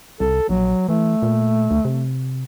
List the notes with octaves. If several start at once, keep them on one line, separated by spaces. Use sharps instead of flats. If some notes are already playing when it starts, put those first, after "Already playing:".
C2 A4
A#1 F#3
E3 A3
A#2
D2
C3